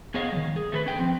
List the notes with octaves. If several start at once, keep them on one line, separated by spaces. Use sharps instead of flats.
B3 G#4 C#5 D#5 F5
D#3 G3
G#4
A3 A4 B4
C#4 G#4 G5
F3 C4